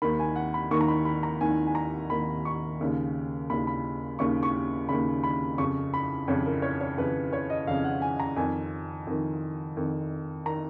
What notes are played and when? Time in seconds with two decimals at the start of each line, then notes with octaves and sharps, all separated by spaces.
0.02 D#2 D#3 B5
0.20 G#5
0.36 F#5
0.54 B5
0.71 D#2 D#3 C#6
0.81 A#5
0.88 B5
1.05 B5
1.23 A#5
1.41 D#2 D#3 G#5
1.67 G#5
1.75 A#5
2.10 D#2 D#3 B5
2.45 C#6
2.81 D#2 C#3
3.49 D#2 C#3 B5
3.67 B5
4.19 D#2 C#3 C#6
4.43 C#6
4.89 D#2 C#3 B5
5.24 B5
5.58 F2 C#3 C#6
5.94 B5
6.28 F2 C#3 C#5
6.46 A#4
6.62 C#5
6.81 C#5
6.97 F2 C#3 B4
7.33 C#5
7.50 D#5
7.67 F2 C#3 F5
7.84 F#5
8.02 G#5
8.20 A#5
8.36 F2 D#3 G#5
9.07 F2 D#3
9.77 F2 D#3
10.45 D#3 A#5